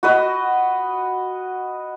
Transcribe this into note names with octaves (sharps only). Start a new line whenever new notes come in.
F#4 B4 D#5